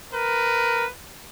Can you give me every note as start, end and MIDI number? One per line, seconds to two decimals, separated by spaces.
0.14 0.85 70
0.14 0.90 71